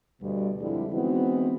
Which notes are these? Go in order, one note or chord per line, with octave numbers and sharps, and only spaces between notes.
D2 B2 G3
F2 D3 G3 G#3 E4
E3 G#3 B3 C4 D#4 F#4